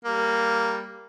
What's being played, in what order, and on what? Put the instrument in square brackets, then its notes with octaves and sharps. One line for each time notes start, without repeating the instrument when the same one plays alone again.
[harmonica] G3 A#3